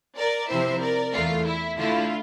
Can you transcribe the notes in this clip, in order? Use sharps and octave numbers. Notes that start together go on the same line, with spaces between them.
A#4 D5
C3 F3 C4 E4 C5 E5
A#4 D5
E2 E3 A3 F4
E4
D3 A3 E4 F4